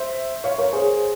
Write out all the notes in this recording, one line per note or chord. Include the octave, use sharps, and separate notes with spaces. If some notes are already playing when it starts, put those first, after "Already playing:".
Already playing: C5 E5
C#5 F5
A#4 C#5
G#4 C5